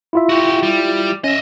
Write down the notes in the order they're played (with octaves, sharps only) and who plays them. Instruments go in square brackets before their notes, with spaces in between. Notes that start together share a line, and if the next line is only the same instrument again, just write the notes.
[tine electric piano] E4 F4 E5
[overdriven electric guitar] F#4 G4
G3
[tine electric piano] C#4 [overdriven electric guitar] D#5 E5